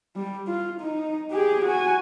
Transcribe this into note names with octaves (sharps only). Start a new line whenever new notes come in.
G3
F4
D#4
G4 G#4
F#4 G#5